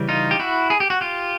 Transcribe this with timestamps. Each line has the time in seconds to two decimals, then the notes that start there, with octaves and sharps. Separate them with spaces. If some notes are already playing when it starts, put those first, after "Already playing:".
Already playing: C#3 E3 G3
0.09 D#4 F4
0.31 G4
0.39 E4 F#4
0.70 G#4
0.80 G4
0.90 F#4
1.01 F4 G4